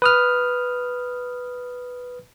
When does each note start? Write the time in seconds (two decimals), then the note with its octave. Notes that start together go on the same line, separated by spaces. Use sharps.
0.02 B4 D#6 F6